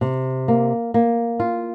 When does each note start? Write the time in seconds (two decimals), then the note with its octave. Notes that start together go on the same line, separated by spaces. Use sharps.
0.01 C3
0.48 A#3
0.94 A#3
1.40 F4